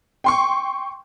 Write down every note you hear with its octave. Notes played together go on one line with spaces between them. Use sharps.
G5 C6 C#6